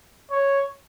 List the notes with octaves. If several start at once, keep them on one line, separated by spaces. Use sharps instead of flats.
C#5